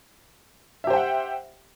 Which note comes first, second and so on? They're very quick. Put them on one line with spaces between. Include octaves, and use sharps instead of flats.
E5 G4 C5 G5 F#5